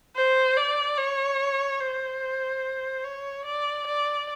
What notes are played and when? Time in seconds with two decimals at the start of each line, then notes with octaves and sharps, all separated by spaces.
0.16 C5
0.57 D5
0.97 C#5
1.80 C5
3.04 C#5
3.45 D5
3.87 D5